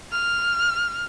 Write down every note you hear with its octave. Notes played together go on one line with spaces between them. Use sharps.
F6